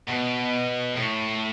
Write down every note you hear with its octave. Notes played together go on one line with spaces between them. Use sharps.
B2
A2